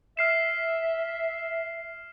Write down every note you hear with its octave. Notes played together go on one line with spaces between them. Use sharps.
E5 F6 C7 E7